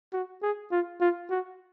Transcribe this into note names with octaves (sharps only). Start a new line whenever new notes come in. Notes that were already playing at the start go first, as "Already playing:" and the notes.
F#4
G#4
F4
F4
F#4